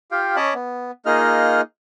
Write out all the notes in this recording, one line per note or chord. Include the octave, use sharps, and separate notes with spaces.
F4 G4 F5 G5
C#4 C#5 D#5 A5 B5 D6
B3
A#3 D#4 F4 G#4 D#5 F6